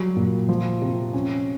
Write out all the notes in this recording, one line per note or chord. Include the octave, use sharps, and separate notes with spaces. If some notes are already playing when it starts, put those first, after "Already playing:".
Already playing: F#3 G3
A#2
F3
C3
C#4